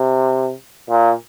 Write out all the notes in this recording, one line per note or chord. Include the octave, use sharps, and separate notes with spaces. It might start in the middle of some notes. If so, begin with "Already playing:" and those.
Already playing: C3
A#2